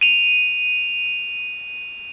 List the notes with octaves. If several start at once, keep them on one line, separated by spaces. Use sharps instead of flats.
D#7 F7